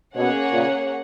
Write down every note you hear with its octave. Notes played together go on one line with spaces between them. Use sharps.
B2 A#3 C#4 G#4 C#5 F#5
A#2 C#3